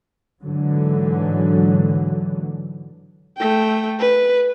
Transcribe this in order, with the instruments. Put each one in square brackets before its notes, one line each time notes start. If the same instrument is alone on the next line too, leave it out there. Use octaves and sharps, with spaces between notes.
[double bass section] G#2 D3 E3 F#3
[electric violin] A3 G5
B4